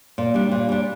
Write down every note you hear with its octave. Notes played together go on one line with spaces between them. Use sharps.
A#2
G3 D4
A#2
G3 D4